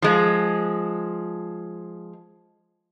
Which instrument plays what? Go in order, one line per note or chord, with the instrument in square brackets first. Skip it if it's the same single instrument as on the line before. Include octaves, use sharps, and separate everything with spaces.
[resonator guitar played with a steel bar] F3 G#3